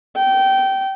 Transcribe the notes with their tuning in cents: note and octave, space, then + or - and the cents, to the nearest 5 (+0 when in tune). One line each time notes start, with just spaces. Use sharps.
G5 -20